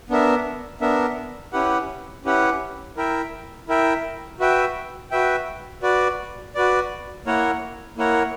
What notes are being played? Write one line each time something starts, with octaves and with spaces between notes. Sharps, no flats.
B3 D4 A#4 E5
B3 D4 A#4 E5
C#4 E4 G4 B4 F#5
C#4 E4 G4 B4 F#5
E4 A#4 E5 G5
E4 A#4 E5 G5
F#4 B4 E5 G5
F#4 B4 E5 G5
F#4 B4 D5
F#4 B4 D5
A#3 E4 A#4 C#5 F#5
A#3 E4 A#4 C#5 F#5